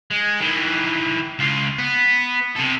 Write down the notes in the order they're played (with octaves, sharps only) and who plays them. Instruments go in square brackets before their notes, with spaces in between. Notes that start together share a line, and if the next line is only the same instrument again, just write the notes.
[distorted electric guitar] G#3
D#3 E3
C#2 F4
B3
C3 A4